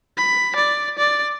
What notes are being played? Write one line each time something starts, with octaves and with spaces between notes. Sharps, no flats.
B5
D5
D5